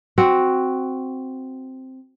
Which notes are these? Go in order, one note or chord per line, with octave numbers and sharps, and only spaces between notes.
C4 F#4